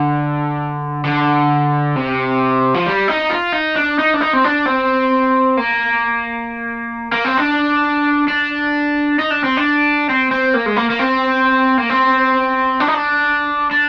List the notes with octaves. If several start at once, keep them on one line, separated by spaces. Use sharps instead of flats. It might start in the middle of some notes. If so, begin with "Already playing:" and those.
Already playing: D3
D3
C3
F3
G3
D#4
F4
D#4
D4
D#4
D4
D#4
C4
D4
C4
A#3
A#3
C4
D4
D4
D#4
D4
C4
D4
C4
C4
A#3
G#3
A#3
A#3
C4
A#3
C4
D4
D#4
D4
D4